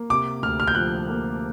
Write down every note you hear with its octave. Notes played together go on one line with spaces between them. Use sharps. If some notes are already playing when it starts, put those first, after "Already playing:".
Already playing: A#3
C3 D6
D2 F6
F6
G6
F3 F#6
A#3